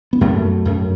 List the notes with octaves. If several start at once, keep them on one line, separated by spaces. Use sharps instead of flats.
B3
F#2 A3
F#2